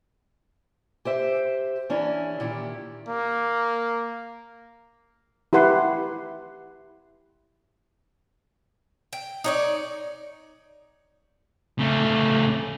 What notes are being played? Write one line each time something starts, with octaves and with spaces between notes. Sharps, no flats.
G4 C5 E5
E3 C#4 D4 E4
A#2 D#3 E4 G4
A#3
E4 G4 B4 F#5 C6
G5
D#4 C#5 D5
C#3 A3